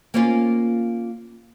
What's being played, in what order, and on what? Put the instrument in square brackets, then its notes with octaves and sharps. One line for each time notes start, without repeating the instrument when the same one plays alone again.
[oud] A#3 C#4 F4